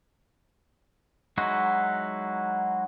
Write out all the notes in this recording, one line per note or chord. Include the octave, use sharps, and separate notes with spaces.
F#3 G#3 D#4 E4 F#4